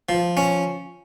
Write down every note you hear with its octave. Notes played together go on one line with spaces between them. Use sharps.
F3
C#4